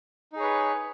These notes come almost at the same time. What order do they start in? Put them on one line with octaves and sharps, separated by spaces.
D#4 G#4 C#5 B4